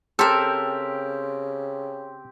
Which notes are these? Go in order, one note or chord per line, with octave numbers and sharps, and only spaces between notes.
C#3 C4 G4 A4 A#4 E6